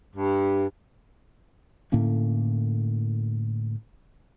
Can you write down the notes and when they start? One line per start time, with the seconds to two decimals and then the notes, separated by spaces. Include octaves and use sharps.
0.16 G2
1.92 A2 D3 A#3 C#4